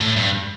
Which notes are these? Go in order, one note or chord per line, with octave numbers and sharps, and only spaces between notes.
A2
G2